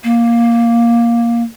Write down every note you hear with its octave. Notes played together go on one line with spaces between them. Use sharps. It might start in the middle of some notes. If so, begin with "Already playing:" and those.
A#3